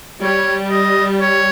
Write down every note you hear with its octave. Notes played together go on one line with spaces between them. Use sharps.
G3 C#5
D#5
C#5